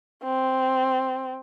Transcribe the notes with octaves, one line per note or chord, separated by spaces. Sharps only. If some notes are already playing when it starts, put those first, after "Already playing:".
C4